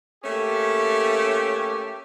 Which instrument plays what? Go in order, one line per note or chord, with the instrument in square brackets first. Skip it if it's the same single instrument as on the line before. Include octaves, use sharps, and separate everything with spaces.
[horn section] A3 A#3 C#4 G4